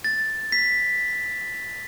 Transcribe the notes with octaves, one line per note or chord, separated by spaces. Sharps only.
A6
B6